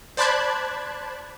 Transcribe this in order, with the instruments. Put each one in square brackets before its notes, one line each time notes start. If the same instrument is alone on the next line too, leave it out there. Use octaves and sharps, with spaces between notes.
[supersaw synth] C5 D5 A5 B5 F#6 G#6